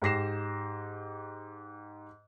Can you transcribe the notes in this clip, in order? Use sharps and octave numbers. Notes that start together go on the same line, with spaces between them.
G#2 G4 A#6 C7 E7